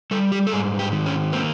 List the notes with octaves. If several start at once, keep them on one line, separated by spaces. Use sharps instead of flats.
G3 A4
G4
A4
G#2 G#4
G4
D#3
C#4
A#3 C4